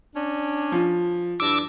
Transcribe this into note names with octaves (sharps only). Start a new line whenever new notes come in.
C#4 D4
F3
G2 D4 E4 D6 E6